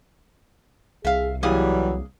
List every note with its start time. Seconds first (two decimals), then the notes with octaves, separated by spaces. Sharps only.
1.05 C2 G#4 E5 F5
1.43 E3 F#3 G3 A#3 G#4